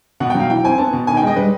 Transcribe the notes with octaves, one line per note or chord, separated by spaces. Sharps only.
B2 F#5
G5
F#3
F5
E3 G5
C4 G#5
B3 A5
B2
D#3 G#5
G5
G#3 D#5
G3 B4